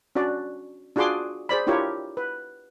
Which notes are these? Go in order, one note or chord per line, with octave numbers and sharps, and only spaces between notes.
C#4 D4 F#4 D5
D4 F4 F#4 G#4 C6 D6
G#4 C5 D5 B5
D4 E4 F4 G4 A#4 C#5
B4